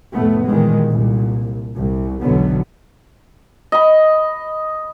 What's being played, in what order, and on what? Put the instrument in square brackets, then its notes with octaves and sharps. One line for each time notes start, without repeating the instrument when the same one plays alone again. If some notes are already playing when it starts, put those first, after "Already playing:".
[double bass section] F1 A2 A3 B3
A#2 D#3 E3 G3 G#3
C2 A#2
C2
B1 E2 B2 D3 F#3 B3
[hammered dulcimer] D#5 B5